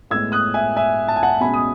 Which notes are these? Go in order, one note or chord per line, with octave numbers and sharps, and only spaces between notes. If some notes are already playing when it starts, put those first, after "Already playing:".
A2 G#3 B3 E6 G#6
D#6 F#6
E5 G#5
E5 G#5
A5
G#5
F#5 A5
B2 G#3 C#4 G#5 B5
D#6